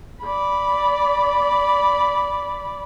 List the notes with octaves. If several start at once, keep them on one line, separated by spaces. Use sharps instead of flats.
D5 B5